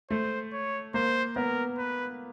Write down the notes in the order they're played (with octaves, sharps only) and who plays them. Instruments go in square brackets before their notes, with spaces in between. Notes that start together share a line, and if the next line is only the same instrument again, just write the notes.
[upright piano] A3 [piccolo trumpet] C5
[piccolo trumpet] C#5
[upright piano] A#3 [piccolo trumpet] C5
[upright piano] B3 [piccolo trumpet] A#4
[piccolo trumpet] B4